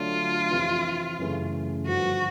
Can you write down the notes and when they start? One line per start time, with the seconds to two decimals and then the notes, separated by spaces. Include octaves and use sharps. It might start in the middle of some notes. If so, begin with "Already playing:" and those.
Already playing: D3 F#3 A3 D4 F4
0.51 F2 C3 E3
1.19 F#2 C#3 E3 A3
1.87 G2 D3 F3 F#4